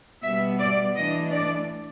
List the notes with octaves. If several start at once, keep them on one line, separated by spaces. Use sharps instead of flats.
B2 G3 B3 E5
D5
E3 A3 D4 D#5
D5